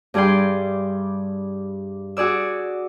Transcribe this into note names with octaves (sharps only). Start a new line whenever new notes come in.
G2 G3 G#4 D5 G5 C6
F#4 G#4 D5 E6